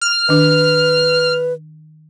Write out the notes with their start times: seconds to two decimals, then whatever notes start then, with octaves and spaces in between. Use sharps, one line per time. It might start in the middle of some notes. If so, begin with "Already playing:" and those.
0.01 F6
0.29 D#3 D4 B4